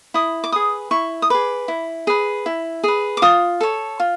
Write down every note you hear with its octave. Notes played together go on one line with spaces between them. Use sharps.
E4 D#6
D6
G#4 B4 D#6
E4 C#6
D#6
G#4 B4 D6
E4
G#4 B4
E4
G#4 B4
D6
F4 D#6
A4 C#5
F4